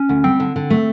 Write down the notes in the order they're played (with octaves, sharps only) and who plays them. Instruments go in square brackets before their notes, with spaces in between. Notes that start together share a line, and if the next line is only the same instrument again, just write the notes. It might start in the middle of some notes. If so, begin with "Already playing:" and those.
Already playing: [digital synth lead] C#4
[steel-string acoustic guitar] D2
[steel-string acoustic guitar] G3 [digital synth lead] C4
[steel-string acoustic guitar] D3
D3
A3